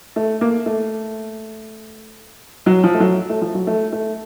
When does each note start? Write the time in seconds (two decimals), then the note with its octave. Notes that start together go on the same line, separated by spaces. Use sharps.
0.16 A3
0.41 A#3
0.66 A3
2.66 F#3
2.84 F3
2.94 A3
3.00 F#3
3.29 A3
3.42 F3
3.55 F#3
3.67 A3
3.92 A3